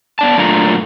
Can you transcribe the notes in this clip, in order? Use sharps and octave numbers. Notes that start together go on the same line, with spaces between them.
B3 D5 A5
F#2 A#2 A3 D4 F4 A#5